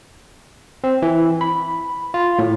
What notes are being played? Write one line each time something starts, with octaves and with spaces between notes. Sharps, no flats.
C4
E3
B5
F4
A2